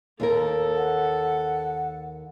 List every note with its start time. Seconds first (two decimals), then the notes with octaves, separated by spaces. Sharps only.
0.20 D#2 A#3 A4 A#4
0.77 F#5